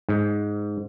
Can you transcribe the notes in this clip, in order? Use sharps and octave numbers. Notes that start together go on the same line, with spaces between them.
G#2